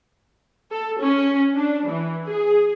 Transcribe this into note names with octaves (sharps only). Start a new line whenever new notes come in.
A4
C#4
D4
E3
G#4